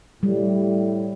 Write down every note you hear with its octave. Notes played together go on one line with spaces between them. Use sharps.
A2 G3